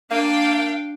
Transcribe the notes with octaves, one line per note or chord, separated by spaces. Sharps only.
A#3 D4 F5 G5